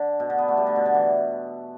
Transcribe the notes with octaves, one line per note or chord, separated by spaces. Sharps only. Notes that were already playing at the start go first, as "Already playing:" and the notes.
Already playing: D3
B2
D3
B3
A3
G3
D3
B2
D3
E3